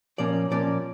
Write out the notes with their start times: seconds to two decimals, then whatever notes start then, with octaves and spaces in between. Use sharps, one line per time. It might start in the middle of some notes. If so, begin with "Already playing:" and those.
0.18 A#2 F3 A#3 C#4 D5
0.51 A#2 F3 A#3 C#4 D5